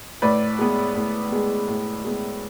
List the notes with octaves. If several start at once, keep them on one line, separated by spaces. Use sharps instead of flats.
A2 B4 D5
G#3 B3
A2
G#3 B3
A2
G#3 B3